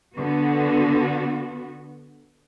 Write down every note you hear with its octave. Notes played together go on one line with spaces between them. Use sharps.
D3 B3 F#4